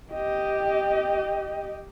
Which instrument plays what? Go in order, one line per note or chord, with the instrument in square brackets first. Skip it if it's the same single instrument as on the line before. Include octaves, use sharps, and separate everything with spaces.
[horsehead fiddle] G4 D#5